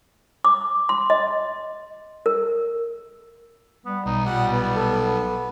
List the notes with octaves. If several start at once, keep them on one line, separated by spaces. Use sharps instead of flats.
D6
C6
D#5
A#4
G3 B3
B1 D#4
A#2 G3 F#5
B3
A4